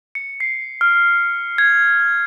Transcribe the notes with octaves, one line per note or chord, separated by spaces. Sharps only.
C#7
C7
F6
G#6